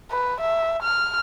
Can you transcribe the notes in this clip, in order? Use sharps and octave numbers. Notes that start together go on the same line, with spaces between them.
B4
E5
F6